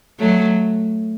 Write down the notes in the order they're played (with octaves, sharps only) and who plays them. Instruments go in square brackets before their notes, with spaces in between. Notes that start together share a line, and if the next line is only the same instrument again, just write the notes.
[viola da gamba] F#3 A3